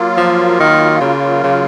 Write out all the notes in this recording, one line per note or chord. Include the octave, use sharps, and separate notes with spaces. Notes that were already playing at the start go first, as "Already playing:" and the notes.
Already playing: F#3 A#3 F4
F3
D#3
C#3
C#3